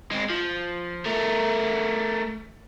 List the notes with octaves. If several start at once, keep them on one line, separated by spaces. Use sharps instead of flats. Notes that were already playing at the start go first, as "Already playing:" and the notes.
G#3 C4
F3
A3 A#4